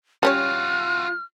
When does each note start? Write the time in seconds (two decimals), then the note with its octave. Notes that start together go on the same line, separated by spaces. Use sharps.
0.23 G3 C#4 F4 F#4 C#5 F6